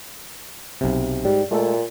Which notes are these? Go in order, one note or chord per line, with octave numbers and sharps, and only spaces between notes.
B1 C3
G#2 G3
A#2 G#3 A3 A4